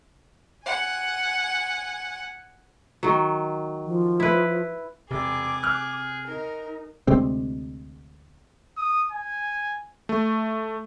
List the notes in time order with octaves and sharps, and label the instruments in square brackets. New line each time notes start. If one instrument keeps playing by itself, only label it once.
[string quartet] F#5 G#5
[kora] D#3 F#3
[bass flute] F3
[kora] E4 B4
[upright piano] E1 [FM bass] C3 [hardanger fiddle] G#4 [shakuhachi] D6
[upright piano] F6 F#6
[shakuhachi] D#4 [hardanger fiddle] A#4
[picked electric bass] D2 C3 G#3 C4
[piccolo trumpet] D#6
G#5
[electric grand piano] A3